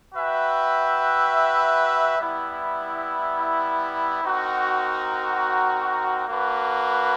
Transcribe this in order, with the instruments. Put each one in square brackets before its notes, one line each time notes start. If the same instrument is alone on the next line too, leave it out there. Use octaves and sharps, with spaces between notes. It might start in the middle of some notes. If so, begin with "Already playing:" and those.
[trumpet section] F#4 B4 E5 G5
G3 B3 E4
C4 D#4 F#4 A#4
A#3 D4 F#4 B4